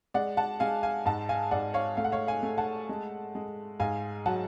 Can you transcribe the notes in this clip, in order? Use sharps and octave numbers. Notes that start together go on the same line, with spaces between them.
G#3 D5 F#5
F#5 A5
G#3 F5 G#5
F5 G#5
G#2 F#5 A5
F5 G#5
G#2 D5 F#5
C#5 F5
A3 F5
F#5
C#5 F5
F5 G#5
A3
F#5 A5
G#3
G#3
G#2 F5 G#5
F#3 F#5 A5